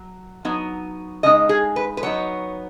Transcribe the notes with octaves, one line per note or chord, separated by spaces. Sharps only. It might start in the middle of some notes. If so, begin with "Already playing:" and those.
Already playing: F#3
F#3 B3 D#4
C#3 G#3 D#4 D#5
G#4
B4
B4
F#3 B3 D#4 C#5